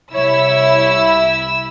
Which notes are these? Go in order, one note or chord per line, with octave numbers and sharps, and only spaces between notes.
C2 E4 C#5 E6